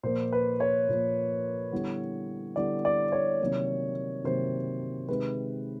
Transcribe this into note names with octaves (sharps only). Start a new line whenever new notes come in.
A#2 F3 A#3 C5
B4
C#5
A#2 F3 A#3
D3 G3 B3 E4
D3 G3 B3 E4 D5
D5
C#5
C3 D#3 F#3 A#3
C3 D#3 F#3 A#3 C5
C3 D#3 G#3 B4